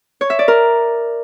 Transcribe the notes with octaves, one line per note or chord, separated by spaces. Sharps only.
C#5
E5
D5
A#4